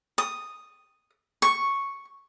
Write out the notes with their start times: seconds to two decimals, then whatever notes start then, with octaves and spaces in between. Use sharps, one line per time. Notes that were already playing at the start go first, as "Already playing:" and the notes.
0.18 D#6
1.42 C#6